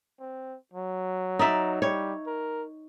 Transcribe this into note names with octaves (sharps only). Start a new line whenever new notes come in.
C4
F#3
D#4 D5 E5
G3 C#5
A#4